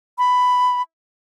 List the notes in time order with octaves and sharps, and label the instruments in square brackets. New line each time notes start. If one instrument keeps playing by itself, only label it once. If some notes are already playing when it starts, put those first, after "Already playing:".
[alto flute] B5